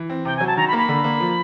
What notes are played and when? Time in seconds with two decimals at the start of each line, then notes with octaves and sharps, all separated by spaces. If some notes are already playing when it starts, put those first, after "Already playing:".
Already playing: E3
0.10 C4
0.25 C3 G5
0.36 F#3 G#5
0.47 A5
0.57 D#3 A#5
0.67 B5
0.73 A#3
0.78 B5
0.89 D3
1.04 A#3
1.21 F3